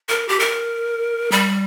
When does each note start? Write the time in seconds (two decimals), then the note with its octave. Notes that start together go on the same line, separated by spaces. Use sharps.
0.09 A#4
0.28 G4
0.39 A#4
1.32 G3